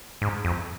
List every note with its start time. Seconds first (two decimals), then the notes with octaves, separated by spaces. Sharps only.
0.22 G#2
0.45 F2